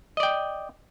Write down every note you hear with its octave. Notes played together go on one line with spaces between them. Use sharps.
D5 D#5 G5